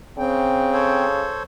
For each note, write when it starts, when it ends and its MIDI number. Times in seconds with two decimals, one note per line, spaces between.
0.18 1.29 49
0.18 1.05 60
0.18 1.05 79
0.73 1.43 69
0.73 1.43 72
0.73 1.43 73